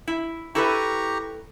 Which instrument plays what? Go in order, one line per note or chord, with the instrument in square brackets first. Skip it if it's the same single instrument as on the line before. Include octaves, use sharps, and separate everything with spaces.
[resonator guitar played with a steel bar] E4
[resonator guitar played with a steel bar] E4 A4 B4 [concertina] G4 A#5 C#6